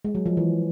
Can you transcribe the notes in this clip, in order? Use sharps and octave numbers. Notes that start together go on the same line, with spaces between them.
G#3
F#3
F3
E3